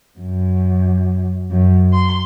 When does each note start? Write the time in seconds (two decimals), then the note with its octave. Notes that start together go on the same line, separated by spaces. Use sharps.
0.18 F#2
1.51 F#2
1.92 C6